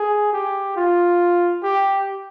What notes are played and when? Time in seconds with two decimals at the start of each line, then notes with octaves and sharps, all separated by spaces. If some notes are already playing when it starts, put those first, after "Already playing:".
Already playing: G#4
0.33 G4
0.76 F4
1.63 G4